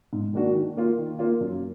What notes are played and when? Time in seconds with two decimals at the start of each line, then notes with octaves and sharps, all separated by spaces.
0.13 G#2
0.34 D#3 A#3 D4 F#4
0.55 D#3
0.77 A#3 F4
0.98 D#3
1.19 A#3 F4
1.41 F#2